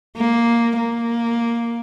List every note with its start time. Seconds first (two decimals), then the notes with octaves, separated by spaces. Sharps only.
0.17 A#3
0.78 A#3